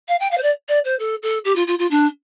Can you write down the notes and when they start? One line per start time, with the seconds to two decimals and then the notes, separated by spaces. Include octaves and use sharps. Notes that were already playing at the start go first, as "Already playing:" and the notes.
0.08 F5
0.20 G5
0.31 F5
0.38 C5
0.43 D5
0.68 D5
0.85 C5
0.99 A4
1.23 A4
1.45 G4
1.56 F4
1.67 F4
1.79 F4
1.91 D4